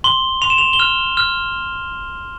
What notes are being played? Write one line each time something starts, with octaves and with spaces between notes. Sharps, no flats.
C6 G7
C6 F7
E7
F7
G7
F6 F7
F6